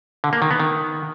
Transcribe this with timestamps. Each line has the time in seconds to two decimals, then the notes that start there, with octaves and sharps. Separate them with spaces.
0.24 D3
0.33 A#3
0.42 D#3
0.51 B3
0.60 D#3